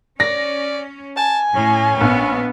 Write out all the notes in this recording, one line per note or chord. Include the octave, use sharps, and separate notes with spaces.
C#4 D5 A#6
G#5 A5
A2 C#4
A#1 B3